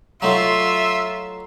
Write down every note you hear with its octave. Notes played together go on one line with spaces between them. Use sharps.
F#3 A3 D#4 F4 E5 A#5 C6 C7